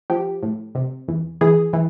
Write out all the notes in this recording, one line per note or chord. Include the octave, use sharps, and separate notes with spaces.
F3 G4
A2
C3
E2
E3 G#4
E3